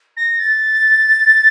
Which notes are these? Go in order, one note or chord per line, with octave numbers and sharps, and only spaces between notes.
A#6
A6